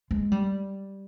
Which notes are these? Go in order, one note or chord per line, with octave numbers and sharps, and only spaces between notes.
G#3
G3